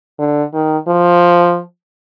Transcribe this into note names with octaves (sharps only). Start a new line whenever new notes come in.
D3
D#3
F3